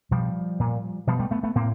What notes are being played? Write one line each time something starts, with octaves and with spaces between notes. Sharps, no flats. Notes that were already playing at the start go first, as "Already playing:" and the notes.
B2 F3 G3
A#2
B2 F3 G3
G3 A3
A3 B3
A3 B3
A2 A#3 C4